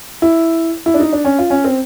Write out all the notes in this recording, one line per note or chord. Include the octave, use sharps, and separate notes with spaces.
E4
E4
D4
D#4
D4
C#4
F4
C#4
C4